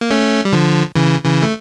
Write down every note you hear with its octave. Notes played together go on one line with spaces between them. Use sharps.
A#3
A3 C#4
G3
D3 F3
C#3 E3
C#3 E3
A3